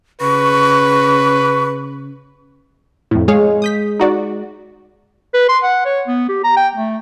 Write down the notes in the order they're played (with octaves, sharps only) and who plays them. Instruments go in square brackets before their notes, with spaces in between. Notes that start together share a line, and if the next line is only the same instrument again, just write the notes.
[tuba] C#3 [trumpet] B4 [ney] C#6
[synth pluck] F2 A2
[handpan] G#3 [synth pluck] G#4 C#5 F5
[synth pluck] D#6 G6 B6
D#4 F#4 D5
[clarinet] B4
C6
F#5
C#5
B3
G4
A#5
G5
A3